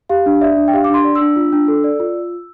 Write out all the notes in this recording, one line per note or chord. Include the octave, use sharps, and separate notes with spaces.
G4 F5
D4
D5 E5
D4
G5
G4 F5
D6
D4 C6
D5
E6
D4
F4
D4
A4
D5
F4